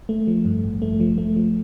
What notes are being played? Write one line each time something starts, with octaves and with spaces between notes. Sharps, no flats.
A3
F3
G2
A1
A3
F3
A3
F3